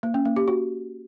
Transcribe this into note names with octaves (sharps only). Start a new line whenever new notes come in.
A#3
C#4
A#3
G4
F#4